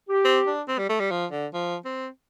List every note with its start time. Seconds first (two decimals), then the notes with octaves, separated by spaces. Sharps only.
0.09 G4
0.25 C4
0.47 D4
0.68 C4
0.78 G3
0.89 A3
1.00 G3
1.11 F3
1.32 D3
1.54 F3
1.85 C4